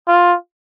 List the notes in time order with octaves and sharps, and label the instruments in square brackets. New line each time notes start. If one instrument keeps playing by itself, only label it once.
[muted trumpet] F4